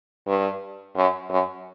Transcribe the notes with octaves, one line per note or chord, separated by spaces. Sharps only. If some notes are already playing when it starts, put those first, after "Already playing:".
G2
F#2
F#2